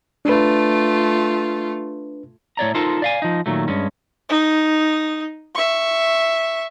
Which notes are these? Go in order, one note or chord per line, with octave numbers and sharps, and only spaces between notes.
A3 D4 F4 B4
A2 C#5 D5 A#5
D#4 F4 A4 A#4 C5
D5 F5 G#5
F3 D#4
A#2 D#3 F#3 A3
G2 G#3 C#4
D#4
E5 C#6